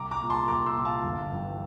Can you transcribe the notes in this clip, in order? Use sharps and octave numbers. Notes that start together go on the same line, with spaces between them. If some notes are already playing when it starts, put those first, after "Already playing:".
Already playing: C2 A#5 D6
A#5 D6
A#2
A5 C6
C2 A#5 D6
C6 E6
A#2
F5 A5
G1
G2 E3